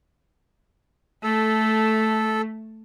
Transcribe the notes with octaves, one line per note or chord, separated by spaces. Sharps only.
A3 A4